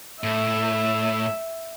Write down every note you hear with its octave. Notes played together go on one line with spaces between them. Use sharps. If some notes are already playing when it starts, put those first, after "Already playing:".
A2 E5